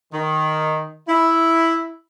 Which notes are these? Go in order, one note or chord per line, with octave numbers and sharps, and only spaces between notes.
D#3
E4